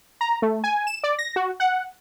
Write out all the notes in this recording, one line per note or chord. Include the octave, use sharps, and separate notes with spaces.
A#5
A3
G#5
E7
D5
A#6
F#4
F#5